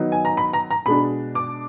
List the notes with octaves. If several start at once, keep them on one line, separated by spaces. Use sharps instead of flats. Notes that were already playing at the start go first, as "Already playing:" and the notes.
Already playing: D#3 F#3 B3 D#4
G#5
A#5
B5
A#5
A#5
B2 G#3 D4 B5
D6